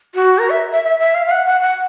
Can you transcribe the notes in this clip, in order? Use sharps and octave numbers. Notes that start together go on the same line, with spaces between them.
F#4
A#4
E5
E5
E5
E5
F5
F5
F#5
F#5
F#5